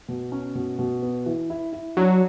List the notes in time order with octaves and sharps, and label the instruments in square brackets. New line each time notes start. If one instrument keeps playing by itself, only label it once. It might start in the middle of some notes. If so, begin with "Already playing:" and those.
[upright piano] B2
C#4
B2
B2
B3
E3
E4
E4
[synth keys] F#3 [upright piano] D4